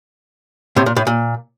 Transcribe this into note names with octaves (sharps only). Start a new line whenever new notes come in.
A2 C3
A#2
A2
A#2